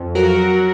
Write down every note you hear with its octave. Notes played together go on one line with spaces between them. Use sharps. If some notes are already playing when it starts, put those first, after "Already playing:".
Already playing: F2
F#3 F#4 A#4
F#3